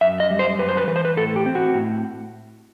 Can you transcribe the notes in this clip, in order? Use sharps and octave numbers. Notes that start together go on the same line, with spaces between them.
F#2 E5
D#5
G3
C5
F#2 B4
C5
B4
E3 B4
C5
B4
A2 A4
G4
C4
F#4
A2